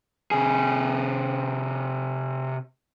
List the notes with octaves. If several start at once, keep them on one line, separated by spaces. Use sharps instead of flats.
C3 G#4